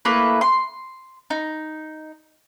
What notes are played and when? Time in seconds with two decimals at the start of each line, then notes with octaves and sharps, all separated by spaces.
0.05 A3 A#3 E4 B4
0.41 C6
1.30 D#4